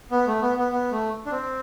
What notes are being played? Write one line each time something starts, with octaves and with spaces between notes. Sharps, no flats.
B3
A3
B3
B3
B3
A3
D4
C4